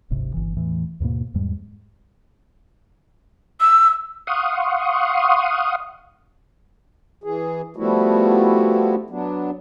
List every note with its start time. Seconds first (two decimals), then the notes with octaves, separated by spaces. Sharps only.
0.10 D1 G1 G#2 C3
0.34 G1 E3
0.57 E2 A2 E3
1.00 D#2 G#2 B2 A#3
1.34 E2 G#2 G3 G#3
3.61 E6
4.27 F5 F#5 C6 C#6 D#6
7.24 E3 G#4
7.77 F3 G3 A3 B3 E4 F#4
9.10 F#3 B3 D4